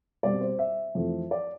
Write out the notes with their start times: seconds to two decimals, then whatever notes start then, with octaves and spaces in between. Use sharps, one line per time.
0.23 B2 G3 C4 D5
0.41 C5
0.59 E5
0.95 F2 E3 A3
1.31 D5